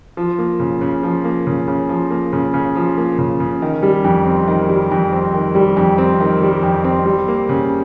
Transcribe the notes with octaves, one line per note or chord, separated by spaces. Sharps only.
F3
A#3
C#3
C#3
F3
A#3
C#3
C#3
F3
A#3
C#3
C#3
F3
A#3
C#3
C#3
D#3
G3
F2
C4
D#3
G3
F2
C4
D#3
G3
F2
C4
D#3
G3
F2
C4
G3
A#3
C#3